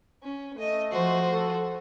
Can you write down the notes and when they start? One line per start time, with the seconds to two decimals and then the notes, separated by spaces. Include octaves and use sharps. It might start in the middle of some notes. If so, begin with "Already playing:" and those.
0.22 C#4
0.57 A3 D#5
0.90 F3 F#4 C5
1.33 A4